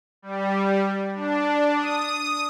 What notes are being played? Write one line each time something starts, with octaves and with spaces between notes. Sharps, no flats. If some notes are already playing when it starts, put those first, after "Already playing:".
G3
D4
D#6